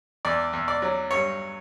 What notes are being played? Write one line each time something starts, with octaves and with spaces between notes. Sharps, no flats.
E2 D5
E2
D5
F#3
G2 C#5